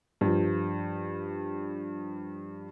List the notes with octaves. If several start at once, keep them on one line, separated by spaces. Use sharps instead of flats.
G2 F3